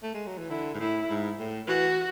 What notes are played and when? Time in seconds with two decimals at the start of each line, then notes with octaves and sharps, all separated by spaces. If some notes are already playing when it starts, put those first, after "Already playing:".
0.03 A3
0.14 G#3
0.26 F#3
0.38 E3
0.50 D3 E4
0.74 G#2
0.80 A2 E4
1.09 G#2
1.40 A2
1.68 E3 F#4